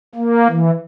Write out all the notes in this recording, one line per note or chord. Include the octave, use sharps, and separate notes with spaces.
A#3
E3